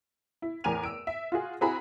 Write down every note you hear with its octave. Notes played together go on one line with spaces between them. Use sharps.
E4
E2 A2 A#4 G#5 D#7 F7
E6 D7
E5
F4 F#4 G#4
C4 E4 F#4 G#4 A#5 B5